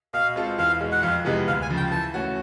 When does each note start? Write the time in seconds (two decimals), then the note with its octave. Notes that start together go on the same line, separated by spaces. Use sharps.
0.14 B2 F5
0.36 G#3 C4 F4 A4
0.58 E2 F5
0.80 B2 G#3
0.92 F#5
1.03 F2 F5
1.25 C3 E3 G#3 B3
1.47 D2 F5
1.62 G#5
1.70 C#3 F3
1.77 G5
1.91 E3 A5
2.14 A3 C#4 F#4